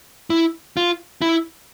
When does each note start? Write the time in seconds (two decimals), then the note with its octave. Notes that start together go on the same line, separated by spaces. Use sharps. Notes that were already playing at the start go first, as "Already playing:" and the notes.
0.30 E4
0.77 F4
1.22 E4